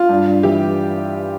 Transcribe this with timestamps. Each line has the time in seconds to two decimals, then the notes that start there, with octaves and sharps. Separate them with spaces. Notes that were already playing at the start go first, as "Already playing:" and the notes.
Already playing: F4
0.09 G2
0.27 G2
0.43 E3 G4